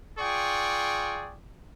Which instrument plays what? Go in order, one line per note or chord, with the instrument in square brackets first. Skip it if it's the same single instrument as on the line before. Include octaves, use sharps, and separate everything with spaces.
[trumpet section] F4 G#4 D5 G5 C#6